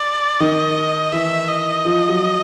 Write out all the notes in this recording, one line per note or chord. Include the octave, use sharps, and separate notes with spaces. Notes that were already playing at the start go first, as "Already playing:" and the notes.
Already playing: D5
D#3 D#5
E3 E5
D#5
F3
F#3